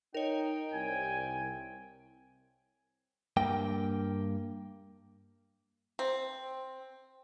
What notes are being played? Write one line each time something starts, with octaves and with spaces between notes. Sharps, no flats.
D#4 A#4 C#5 G5
C2 G#5
G2 A#3 G5
C4